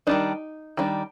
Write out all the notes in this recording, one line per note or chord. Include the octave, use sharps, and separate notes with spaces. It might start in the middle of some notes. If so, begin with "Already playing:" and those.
D#3 G3 D4 D#4
D#3 G3 D4